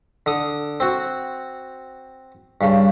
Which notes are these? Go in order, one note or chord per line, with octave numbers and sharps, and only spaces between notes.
D3 D#6
C4 F#4
G2 C#3